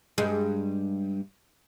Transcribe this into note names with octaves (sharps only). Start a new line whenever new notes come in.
G2 G#3